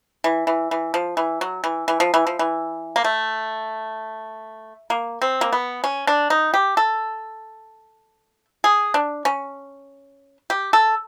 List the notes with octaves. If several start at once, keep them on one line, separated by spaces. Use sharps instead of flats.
E3
E3
E3
F3
E3
F#3
E3
E3
F3
E3
F3
E3
A#3
A3
A#3
C4
A#3
B3
C#4
D4
D#4
G4
A4
G#4
D4
C#4
G4
A4